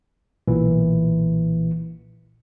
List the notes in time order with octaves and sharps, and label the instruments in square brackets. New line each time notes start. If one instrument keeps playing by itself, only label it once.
[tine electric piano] B1 A#2 E3